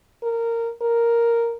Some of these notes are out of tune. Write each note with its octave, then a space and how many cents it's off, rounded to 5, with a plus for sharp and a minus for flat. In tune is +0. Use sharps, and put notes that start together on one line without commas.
A#4 -15
A#4 +0